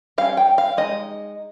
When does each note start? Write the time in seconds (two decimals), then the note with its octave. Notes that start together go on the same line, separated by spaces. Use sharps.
0.18 G3 C#4 F5
0.37 G5
0.58 F5
0.77 G#3 D#4 D#5